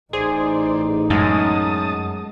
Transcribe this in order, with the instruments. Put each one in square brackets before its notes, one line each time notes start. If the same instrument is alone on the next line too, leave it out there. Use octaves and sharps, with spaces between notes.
[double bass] A1 D#4 [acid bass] G#4 [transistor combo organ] C5 D5
[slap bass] F#2 [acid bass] G#3 [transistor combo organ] A5 D#6